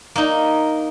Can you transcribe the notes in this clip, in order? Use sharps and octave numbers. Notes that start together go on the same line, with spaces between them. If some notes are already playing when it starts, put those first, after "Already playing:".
A#3 D#4